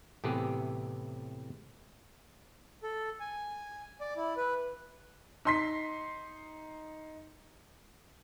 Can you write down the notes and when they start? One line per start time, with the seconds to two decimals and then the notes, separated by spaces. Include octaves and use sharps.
0.24 A2 C3 E3 B3 G4 G#4
2.83 A4
3.20 G#5
4.01 D5
4.17 E4
4.37 B4
5.45 D#4 C6 B6